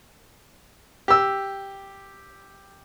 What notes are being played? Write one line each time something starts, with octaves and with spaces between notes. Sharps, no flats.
G4 E6